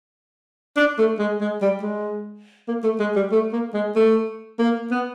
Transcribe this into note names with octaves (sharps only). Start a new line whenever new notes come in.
D4
A3
G#3
G#3
G3
G#3
A#3
A3
G#3
G3
A3
A#3
G#3
A3
A#3
B3